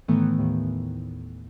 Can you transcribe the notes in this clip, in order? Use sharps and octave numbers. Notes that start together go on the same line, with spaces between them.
A2 D#3 E3 A3 B3
D#2 A2 D#3